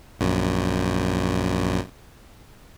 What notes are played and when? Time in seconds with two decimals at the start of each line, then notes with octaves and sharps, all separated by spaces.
0.19 A#1 F#2